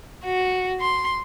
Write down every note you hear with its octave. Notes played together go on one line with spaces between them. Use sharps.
F#4
C6